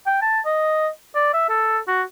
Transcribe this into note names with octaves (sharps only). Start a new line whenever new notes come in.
G5
A5
D#5
D5
E5
A4
F#4